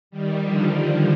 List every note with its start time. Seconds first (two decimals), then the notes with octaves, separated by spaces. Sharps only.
0.11 D#3 G3
0.40 D3 F3
0.71 D3